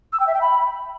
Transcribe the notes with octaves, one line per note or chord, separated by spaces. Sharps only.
E6
G5
E5
G5
B5